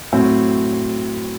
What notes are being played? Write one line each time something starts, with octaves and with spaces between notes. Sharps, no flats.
A2 F#3 C4